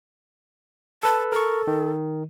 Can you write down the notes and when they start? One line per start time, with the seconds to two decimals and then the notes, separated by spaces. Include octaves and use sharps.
1.03 A4 B4 A5
1.32 A4 A#4 C#6
1.67 D#3